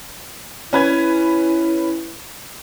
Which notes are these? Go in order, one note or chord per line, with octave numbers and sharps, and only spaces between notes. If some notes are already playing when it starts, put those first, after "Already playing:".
C#4 E4 B4 G#6